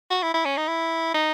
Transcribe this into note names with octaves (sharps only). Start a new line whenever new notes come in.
F#4
E4
E4
C#4
D#4
E4
D#4